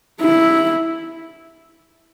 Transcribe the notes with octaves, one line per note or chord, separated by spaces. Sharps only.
E4